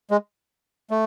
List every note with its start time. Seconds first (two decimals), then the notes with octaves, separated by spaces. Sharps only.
0.11 G#3
0.91 A3